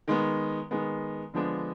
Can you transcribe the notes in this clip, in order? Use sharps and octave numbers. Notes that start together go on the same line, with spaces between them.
D#3 G#3 B3
D#3 G#3 B3
D3 F3 G#3 B3 D4